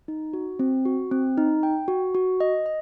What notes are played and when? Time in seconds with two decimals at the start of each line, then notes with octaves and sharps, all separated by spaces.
0.08 D#4
0.33 F#4
0.59 C4
0.85 F#4
1.11 C4
1.37 D#4
1.63 G5
1.88 F#4
2.15 F#4
2.40 D#5
2.66 D#5